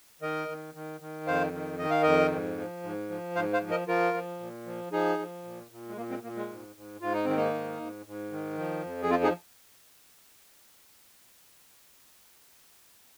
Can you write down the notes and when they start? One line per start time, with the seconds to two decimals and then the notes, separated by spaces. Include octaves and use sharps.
0.22 D#3 A#4 D#5
0.48 D#3
0.74 D#3
1.01 D#3
1.27 F2 C5 F5
1.53 D#3
1.79 D#3 D#5
1.90 F5
2.02 F2 A#4 D#5
2.32 G#2
2.57 F3
2.83 G#2
3.10 F3
3.35 G#2 C5 F5
3.53 C5 F5
3.62 F3
3.71 A#4 D#5
3.88 F3 F4 A#4
4.14 F3
4.40 A#2
4.66 F3
4.92 F3 D#4 G#4
5.19 F3
5.44 A#2
5.71 A#2
5.89 G#3
5.97 A#2 A#3
6.10 G#3 C4
6.23 A#2 A#3
6.36 G#3
6.49 G#2
6.76 G#2
7.01 G#2 F4
7.14 D#4
7.25 D#3 C4
7.36 A#3 D#4
7.54 G#2
7.80 G#2
8.06 G#2
8.32 D#3
8.58 F3
8.84 F2
9.02 G#4
9.10 F3 C4 F4
9.23 D#4 G#4